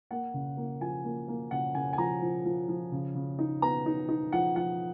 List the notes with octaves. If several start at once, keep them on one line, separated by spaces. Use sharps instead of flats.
A#3 F#5
C#3
A#3
F3 G#5
A#3
A#3
C#3 F#5
C#3 G#5
G#5
F3 A#5
F3
F3
F3
C#3
C#3
D#4
B3 A#5
D#4
D#4
F3 F#5
F3 F#5